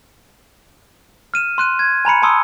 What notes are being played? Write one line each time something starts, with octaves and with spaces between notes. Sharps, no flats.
F6 D#7 E7
C6 F#6 D#7
G#6
G#5 A#5 B5 C#7
G#5 A5 C6 D#6 E6 G7